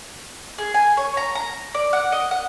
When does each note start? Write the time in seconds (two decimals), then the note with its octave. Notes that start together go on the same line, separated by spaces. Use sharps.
0.58 G#4
0.74 G#5
0.97 C#5
1.17 A#5
1.35 A#5
1.74 D5
1.93 F#5
2.12 D#5
2.31 F#5